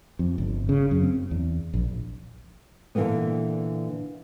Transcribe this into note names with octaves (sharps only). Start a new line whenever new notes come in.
F2
G1
C#3
F#2
C4
E2
A#1
A#2 D3 E3 G#3 A#3 B3